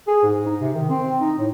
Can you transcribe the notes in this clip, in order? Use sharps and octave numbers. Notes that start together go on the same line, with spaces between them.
G#4
G#2
D#4
C3
D#3
C4
D#4
A2